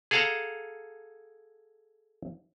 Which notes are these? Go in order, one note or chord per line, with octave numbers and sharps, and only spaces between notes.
G#4 A4 F5 F#5 A5 A#5